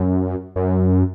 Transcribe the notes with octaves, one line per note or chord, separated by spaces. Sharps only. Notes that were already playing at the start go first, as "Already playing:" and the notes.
Already playing: F#2
F#2